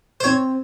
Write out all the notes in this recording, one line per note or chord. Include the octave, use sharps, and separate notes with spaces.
C5
C4 C#5